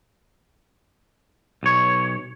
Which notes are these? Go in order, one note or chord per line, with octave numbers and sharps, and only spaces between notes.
B1 C#5